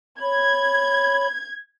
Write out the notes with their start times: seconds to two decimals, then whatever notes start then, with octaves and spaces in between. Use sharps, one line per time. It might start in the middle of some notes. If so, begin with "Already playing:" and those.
0.21 C#5 B5 G#6